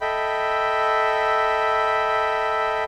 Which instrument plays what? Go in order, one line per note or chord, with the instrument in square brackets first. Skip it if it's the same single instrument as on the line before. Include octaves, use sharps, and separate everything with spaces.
[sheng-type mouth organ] A4 D#5 E5 G5 B5